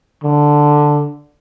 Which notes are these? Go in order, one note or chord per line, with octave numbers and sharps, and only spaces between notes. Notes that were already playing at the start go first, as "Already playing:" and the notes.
D3